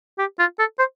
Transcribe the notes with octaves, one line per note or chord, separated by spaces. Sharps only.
G4
F4
A4
C5